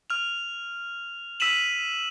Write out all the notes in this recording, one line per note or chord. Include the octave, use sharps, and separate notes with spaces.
F6 F7
E6 B6 D#7 E7 F#7